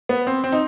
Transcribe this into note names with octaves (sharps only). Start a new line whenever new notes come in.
B3
C4
C4
D#4